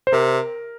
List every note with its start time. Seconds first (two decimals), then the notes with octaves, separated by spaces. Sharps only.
0.07 C5
0.12 C3 A#4